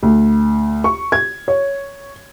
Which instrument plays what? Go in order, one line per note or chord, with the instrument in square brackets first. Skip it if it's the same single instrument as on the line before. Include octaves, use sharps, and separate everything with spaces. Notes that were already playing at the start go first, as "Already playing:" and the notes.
[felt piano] D2
C#6
G#6
C#5